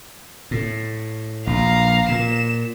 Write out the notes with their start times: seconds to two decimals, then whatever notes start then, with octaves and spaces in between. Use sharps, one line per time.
0.51 A2
1.47 A#1 F5 A#5
2.09 A#2 E7